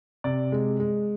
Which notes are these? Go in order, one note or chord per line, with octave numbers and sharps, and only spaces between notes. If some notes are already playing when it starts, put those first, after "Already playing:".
C3 D5
G#3
G#3